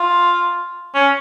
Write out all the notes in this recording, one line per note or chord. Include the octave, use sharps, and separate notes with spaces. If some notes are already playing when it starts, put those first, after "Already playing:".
Already playing: F4
C#4